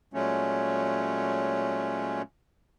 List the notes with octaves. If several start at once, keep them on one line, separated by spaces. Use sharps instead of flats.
A#2 F#3 G#3 A3 C#4